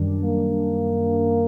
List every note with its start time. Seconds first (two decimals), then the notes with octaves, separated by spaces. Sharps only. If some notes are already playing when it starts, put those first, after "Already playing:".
Already playing: F#2 D#3 G3 D4
0.22 A#3